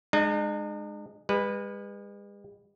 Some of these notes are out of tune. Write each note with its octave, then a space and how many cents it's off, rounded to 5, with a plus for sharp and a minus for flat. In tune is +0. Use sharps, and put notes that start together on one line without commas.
G#3 +0 D#4 -45
G#3 -45 B4 +0